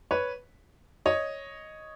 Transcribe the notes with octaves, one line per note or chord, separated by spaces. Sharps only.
B4 C#5
C#5 D#5